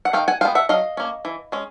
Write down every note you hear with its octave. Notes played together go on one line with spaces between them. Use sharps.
F#5
D#3 F5 G5
F#5 G#5
G#3 B3 F5 G5
E5 F#5
F#3 D#5 F5
A#3 C#4
E3
G#3 C#4